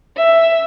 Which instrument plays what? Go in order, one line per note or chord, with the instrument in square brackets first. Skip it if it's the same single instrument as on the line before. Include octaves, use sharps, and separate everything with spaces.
[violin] E5